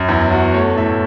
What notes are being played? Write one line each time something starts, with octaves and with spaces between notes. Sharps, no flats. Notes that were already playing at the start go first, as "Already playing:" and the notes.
Already playing: F#2
E2 E4
E2 F#4
A3 C#5
A2 E5